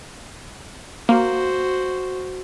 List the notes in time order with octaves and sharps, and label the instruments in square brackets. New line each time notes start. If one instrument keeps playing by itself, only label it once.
[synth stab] A#3 [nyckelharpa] F#4 C5